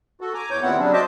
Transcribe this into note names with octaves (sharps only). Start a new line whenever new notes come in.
F#4 A4
G#5 A#5 D6
E2 E3 C#5 D6 G6
D#2 A#2 B3 C4 E4 F#5
C#3 F#3 G3 C4 D4
F#4 C5 D#5 E5 A5 D6